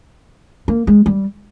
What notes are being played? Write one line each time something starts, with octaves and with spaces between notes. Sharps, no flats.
A#3
G#3
G3